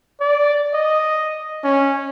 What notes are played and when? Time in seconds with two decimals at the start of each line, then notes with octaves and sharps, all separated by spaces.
0.21 D5
0.74 D#5
1.64 C#4